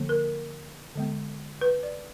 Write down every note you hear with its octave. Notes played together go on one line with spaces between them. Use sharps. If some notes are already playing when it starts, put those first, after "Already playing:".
Already playing: D3 F3 A#3
A#4
D3 G#3 B3
B4
D5